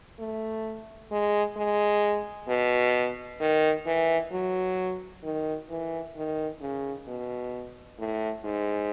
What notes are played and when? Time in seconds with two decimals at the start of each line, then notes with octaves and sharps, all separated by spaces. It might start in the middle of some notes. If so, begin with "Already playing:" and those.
0.19 A3
1.11 G#3
1.56 G#3
2.48 B2
3.40 D#3
3.86 E3
4.32 F#3
5.24 D#3
5.70 E3
6.16 D#3
6.61 C#3
7.08 B2
7.99 A2
8.45 G#2